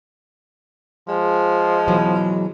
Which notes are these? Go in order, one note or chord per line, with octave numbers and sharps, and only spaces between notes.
F3 G#3
B2 E3 F#3